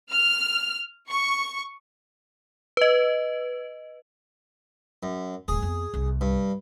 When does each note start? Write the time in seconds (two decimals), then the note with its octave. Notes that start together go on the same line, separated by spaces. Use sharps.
0.11 F6
1.10 C#6
2.77 B4 D#5
5.03 F#2
5.48 D#1 G#2 G#4
5.62 F2 B3
5.94 C2
6.21 G2